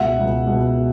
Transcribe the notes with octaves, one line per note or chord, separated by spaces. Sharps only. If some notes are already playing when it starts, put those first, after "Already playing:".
Already playing: C#2 B2 E5 F#5
C#2 B2
C#2 B2
B2